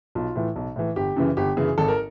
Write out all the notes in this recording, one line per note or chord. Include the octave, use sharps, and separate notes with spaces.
B1 F4
A2 E3
B1
A2 E3
G1 G4
F#2 C#3 E3
G1 G4
F#2 C#3 E3 G#4
G#1 A4
A#4